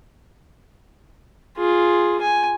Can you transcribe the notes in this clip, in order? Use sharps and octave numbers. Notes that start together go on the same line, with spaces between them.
F4 G#4
G#5